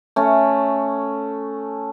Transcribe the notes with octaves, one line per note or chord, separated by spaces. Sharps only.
A3 C#4